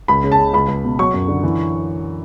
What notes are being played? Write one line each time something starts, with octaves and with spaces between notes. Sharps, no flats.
C#2 B5
C#3
A5
C#3
C#2 B5
C#2
B2
F#3 C#6
F#2
D3
E3